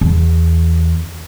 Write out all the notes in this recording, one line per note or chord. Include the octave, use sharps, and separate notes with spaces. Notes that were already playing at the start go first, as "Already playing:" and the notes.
E2